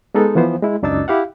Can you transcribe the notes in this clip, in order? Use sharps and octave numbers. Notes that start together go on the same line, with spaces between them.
G#3 B3 D#4 A4
E3 F3 B3 C5
G#3 E4
C#2 F#2 D4 D#4 E6 A6
E4 G4 F5 F#5